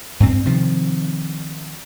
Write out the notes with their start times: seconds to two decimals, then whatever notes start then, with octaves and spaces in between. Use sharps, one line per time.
0.20 G2 C4
0.45 C3 D#3 F3